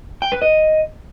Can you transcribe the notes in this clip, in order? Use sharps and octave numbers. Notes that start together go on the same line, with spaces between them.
G5
B4
D#5